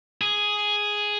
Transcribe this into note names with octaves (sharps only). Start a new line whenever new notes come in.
G#4